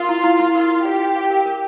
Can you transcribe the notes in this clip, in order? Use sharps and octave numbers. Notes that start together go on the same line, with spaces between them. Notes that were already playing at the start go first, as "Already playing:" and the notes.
Already playing: F4 A#4
E4
E4
E4
F4 A#4
A#4
G4 D5
G5
F5
A#4
A#4